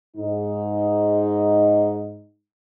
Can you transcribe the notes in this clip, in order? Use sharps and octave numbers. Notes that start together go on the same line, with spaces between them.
G#2 D#4